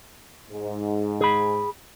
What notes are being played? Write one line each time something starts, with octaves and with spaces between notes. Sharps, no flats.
G#2
G#4 B5